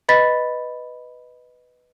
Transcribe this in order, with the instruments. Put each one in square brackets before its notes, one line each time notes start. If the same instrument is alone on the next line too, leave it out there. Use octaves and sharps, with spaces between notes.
[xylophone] B4 D#5 B5 A6 B6